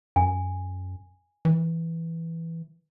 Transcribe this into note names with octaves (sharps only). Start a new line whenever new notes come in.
F#2 G#5
E3